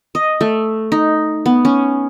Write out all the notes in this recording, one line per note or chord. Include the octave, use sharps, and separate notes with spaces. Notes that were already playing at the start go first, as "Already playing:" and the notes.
D#5
A3
D#4
B3
C#4